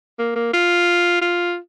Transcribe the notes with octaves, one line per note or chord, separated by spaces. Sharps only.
A#3
A#3
F4
F4